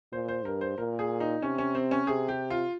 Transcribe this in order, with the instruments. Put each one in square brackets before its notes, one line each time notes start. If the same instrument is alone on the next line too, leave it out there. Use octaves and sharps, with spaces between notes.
[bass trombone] A#2 [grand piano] C5
[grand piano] C5
[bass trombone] G2 [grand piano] A#4
[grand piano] C5
[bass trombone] A#2 [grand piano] A#4
[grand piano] G#4
D#4
[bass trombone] C3 [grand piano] C#4
[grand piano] C#4
C4
C#4
[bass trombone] C3 [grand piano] G#4
[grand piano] G4
F4